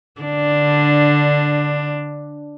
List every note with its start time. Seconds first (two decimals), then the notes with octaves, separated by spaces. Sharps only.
0.21 D3 D4